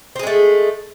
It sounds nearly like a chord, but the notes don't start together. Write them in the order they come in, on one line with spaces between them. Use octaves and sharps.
C4 G#4 G#3 A3